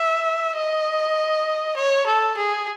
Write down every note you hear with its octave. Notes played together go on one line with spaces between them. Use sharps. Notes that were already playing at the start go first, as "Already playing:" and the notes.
Already playing: E5
D#5
C#5
A4
G#4